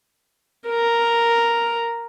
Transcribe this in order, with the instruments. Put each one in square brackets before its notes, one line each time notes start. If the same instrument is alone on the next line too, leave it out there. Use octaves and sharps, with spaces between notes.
[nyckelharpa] A#4